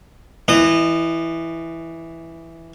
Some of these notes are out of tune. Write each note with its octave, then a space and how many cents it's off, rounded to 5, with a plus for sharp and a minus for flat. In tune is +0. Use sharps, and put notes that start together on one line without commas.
E3 +0 D#5 -30